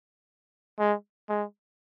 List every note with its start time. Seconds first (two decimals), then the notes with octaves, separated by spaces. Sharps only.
0.79 G#3
1.29 G#3